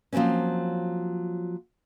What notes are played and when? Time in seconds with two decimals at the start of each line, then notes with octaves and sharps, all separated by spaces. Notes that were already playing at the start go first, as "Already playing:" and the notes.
0.13 F3 F#3 A#3 C4 C#4